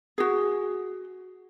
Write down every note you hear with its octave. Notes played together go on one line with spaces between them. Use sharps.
F#4 G#4